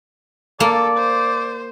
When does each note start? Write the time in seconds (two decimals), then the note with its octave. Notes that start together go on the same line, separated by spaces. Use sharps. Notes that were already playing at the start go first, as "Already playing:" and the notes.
0.60 A#3 A4 D5
0.98 C5